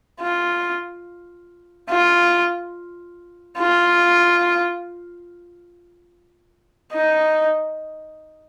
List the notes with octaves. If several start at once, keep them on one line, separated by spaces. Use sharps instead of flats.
F4
F4
F4
D#4